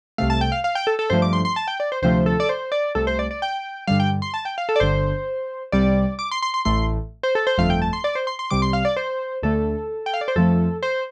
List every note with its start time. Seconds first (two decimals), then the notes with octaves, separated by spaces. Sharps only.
0.18 C2 C3 A3 F5
0.30 A5
0.41 G5
0.52 F5
0.64 F5
0.75 G5
0.87 A4
0.99 A4
1.10 G2 F3 A3 C5
1.22 D6
1.33 C6
1.45 C6
1.56 A5
1.68 G5
1.80 D5
1.92 C5
2.02 D2 C3 F3 A3 C5
2.26 A4
2.40 D5
2.49 C5
2.72 D5
2.95 C2 C3 A3 A4
3.07 C5
3.19 D5
3.31 D5
3.42 G5
3.87 G2 D3 G3 F5
4.00 G5
4.22 C6
4.34 A5
4.45 G5
4.58 F5
4.69 A4
4.76 D5
4.80 G1 G2 D3 C5
5.72 C2 C3 G3 D5
6.19 D6
6.31 C6
6.42 C6
6.54 C6
6.65 A1 A2 A3 C6
7.23 C5
7.35 A4
7.47 C5
7.58 G1 F2 F3 A3 F5
7.70 G5
7.82 A5
7.93 C6
8.04 D5
8.15 C5
8.27 C6
8.39 C6
8.50 C2 C3 G3 D6
8.62 C6
8.73 F5
8.85 D5
8.97 C5
9.43 D2 D3 A3 A4
10.06 G5
10.14 F5
10.21 D5
10.28 C5
10.36 F2 F3 A3 A4
10.83 C5